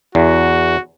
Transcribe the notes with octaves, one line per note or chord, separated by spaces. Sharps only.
E2 F#4